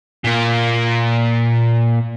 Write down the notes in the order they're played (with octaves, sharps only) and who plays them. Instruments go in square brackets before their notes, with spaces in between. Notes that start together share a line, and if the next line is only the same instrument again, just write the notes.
[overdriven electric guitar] A#2 A#3